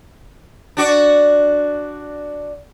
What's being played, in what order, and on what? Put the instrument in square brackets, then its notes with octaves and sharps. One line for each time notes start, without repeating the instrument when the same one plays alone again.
[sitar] D4 F#4 D5